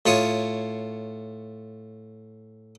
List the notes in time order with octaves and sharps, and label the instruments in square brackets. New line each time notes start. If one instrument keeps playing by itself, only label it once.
[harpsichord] A2 F4 C#5 D#6